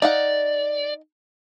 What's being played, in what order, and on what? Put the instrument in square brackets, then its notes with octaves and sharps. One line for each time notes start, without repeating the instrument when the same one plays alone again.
[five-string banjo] D#4 F5 F#5 [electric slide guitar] D5